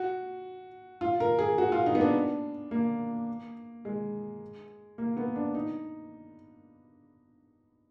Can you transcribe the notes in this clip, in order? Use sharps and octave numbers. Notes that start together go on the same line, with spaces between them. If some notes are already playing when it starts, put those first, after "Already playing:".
Already playing: F#4
F4
A#4
G#4
F#4
F4
D#4
B3
D4
A#3
G#3
A#3
B3
D4
D#4